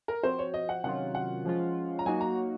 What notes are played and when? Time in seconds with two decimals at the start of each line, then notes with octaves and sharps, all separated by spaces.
0.08 A#4
0.23 F3 C4 F#4 C5
0.39 C#5
0.54 D#5
0.69 F#5
0.84 C3 D#3 F#3 C#4 F4 F#5
1.15 F#5
1.45 F3 G#3 C#4 F4
1.99 A#5
2.06 F#3 A#3 D#4 F#4 G#5
2.21 A#5